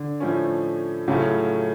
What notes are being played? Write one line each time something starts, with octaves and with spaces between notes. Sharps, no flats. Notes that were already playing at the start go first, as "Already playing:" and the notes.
Already playing: D3
A2 F3 A3 C#4
A2 C#3 F#3 A3 F4